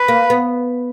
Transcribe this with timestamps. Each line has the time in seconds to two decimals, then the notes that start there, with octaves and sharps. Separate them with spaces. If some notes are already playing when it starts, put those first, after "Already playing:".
Already playing: B4
0.08 A#3
0.30 B3